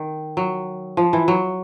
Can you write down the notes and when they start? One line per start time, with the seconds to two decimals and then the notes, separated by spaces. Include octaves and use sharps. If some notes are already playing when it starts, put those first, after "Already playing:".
Already playing: D#3
0.37 F#3
0.97 F3
1.13 E3
1.28 F#3